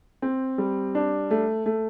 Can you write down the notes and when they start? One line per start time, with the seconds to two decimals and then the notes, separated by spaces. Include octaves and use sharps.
0.22 C4
0.58 G3
0.95 D4
1.31 A3
1.66 A3